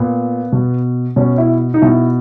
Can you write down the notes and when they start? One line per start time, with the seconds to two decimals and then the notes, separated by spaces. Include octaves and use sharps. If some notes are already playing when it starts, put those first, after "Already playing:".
Already playing: A#2 B3
0.52 B2
1.16 B2 C#4
1.38 E4
1.74 D#4
1.82 B2 E4